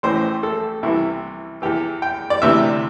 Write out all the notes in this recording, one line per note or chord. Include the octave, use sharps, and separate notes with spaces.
A1 A2 E3 C5
A4
C2 C3 E3 E4
E2 E3 G4
G5
D5
D2 C3 E3 E5